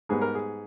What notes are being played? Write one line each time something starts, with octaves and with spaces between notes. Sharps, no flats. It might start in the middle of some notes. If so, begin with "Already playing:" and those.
G#2 G3 B3 G#4
A#4
G#4